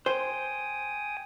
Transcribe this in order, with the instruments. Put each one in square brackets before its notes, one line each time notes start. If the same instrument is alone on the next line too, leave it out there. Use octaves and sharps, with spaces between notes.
[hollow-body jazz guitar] C5 [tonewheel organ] G5 G#5 D#6